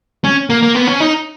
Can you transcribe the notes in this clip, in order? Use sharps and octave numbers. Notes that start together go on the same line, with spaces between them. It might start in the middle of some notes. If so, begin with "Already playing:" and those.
C#4
A#3
A#3
B3
C#4
D#4